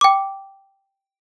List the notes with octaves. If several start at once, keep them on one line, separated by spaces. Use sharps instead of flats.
G5 D6